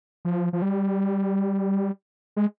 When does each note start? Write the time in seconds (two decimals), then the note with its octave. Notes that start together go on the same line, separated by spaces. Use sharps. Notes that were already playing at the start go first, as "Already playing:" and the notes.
0.25 F3
0.53 F3
0.62 G3
2.36 G#3